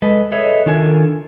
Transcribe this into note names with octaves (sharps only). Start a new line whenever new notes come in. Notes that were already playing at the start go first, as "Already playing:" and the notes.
G#3 A4 B4 D#5
G#4 A4 B4 C#5 D#5 E5
D#3 D4 F4 A4 A#4 G#5